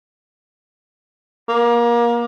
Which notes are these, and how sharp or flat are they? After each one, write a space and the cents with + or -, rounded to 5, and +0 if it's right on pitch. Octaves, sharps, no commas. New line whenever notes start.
A#3 +25